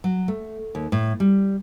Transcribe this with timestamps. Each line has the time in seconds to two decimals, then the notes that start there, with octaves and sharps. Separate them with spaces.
0.04 F#3
0.28 A3
0.75 D#2
0.92 A2
1.20 G3